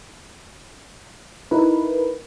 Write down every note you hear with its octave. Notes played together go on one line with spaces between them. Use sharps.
D#4 E4 A#4 B4